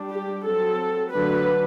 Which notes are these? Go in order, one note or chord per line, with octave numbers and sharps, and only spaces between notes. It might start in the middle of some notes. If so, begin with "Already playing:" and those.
Already playing: G3 D4
G4
F#3 C4 A4
D3 F#3 A3 D4 B4